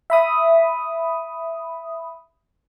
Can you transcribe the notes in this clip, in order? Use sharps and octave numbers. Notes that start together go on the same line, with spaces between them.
E5 B5 D#6